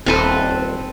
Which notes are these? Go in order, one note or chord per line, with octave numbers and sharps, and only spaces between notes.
D#1 C4 A4 B4